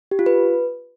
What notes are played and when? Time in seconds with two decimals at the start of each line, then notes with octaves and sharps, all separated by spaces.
0.11 G4
0.19 F4
0.26 B4